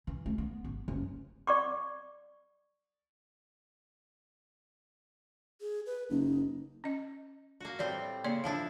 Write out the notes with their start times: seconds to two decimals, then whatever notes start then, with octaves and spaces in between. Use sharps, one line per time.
0.07 E3
0.26 A3
0.38 B3
0.64 G#1
0.88 F#1
1.47 D5 C#6 D6
5.61 G#4
5.86 B4
6.10 F#1 D#4
6.84 C#4 D#5
7.60 A#3 F#4
7.79 A2 G3 C4 D5
8.24 C#3 A#3 D5 C6
8.44 F3 D4 E4 F5